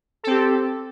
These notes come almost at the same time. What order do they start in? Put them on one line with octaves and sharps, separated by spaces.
A4 C4 G4